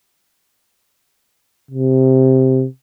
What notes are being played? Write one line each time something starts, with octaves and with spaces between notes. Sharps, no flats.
C3